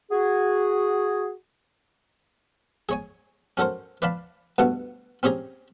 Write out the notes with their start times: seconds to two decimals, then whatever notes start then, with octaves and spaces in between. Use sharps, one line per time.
0.11 F#4 G#4
2.89 G#4 C#5 G#5
3.57 C#4 F#4 A4 A#4 C5
4.02 B4 D5 F5 A5 B5
4.58 D2 G2 B2 F#5
5.23 C4 C#4 G4 G#4 A#5